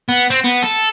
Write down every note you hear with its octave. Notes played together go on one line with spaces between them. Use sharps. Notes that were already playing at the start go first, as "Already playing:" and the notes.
B3
C4
B3
A4